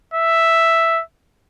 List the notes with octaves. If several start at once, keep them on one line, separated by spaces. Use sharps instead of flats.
E5